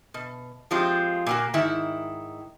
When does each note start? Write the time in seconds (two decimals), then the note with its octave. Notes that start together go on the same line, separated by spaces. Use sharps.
0.14 B2
0.71 F3 G#3 C4 F4 G4
1.26 A#2 A#3 F#4
1.54 G#2 D#3 E4